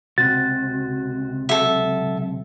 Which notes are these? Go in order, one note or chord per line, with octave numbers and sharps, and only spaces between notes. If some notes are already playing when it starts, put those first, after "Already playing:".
C#2 C3 F#4 A6
F#3 A4 E5